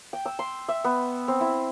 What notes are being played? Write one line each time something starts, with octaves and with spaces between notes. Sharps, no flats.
G5
E6
C6
E5
B3
C4
E4